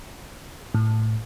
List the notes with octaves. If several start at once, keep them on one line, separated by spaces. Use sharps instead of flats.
A2